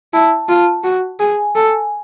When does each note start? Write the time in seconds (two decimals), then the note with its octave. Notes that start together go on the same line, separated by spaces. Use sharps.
0.13 E4 A5
0.49 F4
0.84 F#4
1.20 G#4 G#5
1.55 A4